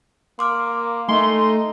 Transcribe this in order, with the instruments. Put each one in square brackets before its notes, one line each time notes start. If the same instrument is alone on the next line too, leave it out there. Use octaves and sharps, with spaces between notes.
[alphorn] A#3 [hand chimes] C6 D6 F6
[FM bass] A3 [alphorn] D#4 [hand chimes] G#5 [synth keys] C6